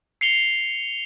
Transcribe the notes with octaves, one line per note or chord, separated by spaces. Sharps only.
C7 C#7 F7 G7